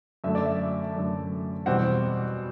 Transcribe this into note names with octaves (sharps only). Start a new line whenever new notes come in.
F#2 D3 A3 E5
D5
E5
F#2 D3 A3
E2 B2 G3 C4 F#5